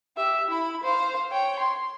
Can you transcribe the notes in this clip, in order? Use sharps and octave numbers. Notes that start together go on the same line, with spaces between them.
G4 E5
E4 B5
C5 F5
C#5 G5
C6